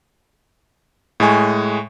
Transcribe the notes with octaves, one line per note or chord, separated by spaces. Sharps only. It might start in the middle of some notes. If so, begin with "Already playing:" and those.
A2 G#3 G#5 C#6